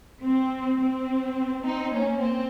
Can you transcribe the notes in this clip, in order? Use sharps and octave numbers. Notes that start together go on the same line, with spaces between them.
C4
C4
C4 D#4
A#3 C#4
C4